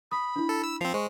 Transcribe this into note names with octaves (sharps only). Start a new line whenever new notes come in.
B5 D#6
D4 E4
A4
E6
F3 C4 C7 F7
G#3 C5 C#6